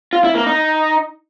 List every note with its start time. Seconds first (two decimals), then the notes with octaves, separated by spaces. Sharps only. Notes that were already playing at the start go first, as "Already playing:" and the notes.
0.13 F4
0.24 E4
0.35 A#3
0.46 D#4